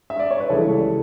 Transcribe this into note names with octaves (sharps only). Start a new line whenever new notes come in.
E5
D5
C#5
B4
C#2 C#3 E3 G3 A4